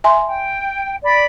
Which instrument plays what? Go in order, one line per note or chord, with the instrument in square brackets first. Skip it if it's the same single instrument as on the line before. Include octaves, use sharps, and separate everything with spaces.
[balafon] E5 G#5 C6
[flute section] G5
D5 B5